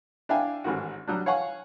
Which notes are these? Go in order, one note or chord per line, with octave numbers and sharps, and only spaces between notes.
D4 E4 F5 G5 G#5
A1 G#2 D#3 F#4
F#3 G3 D4
C#5 F5 F#5 G#5 C#6